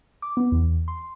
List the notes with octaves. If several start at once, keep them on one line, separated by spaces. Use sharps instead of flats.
D6
B3
E2
C6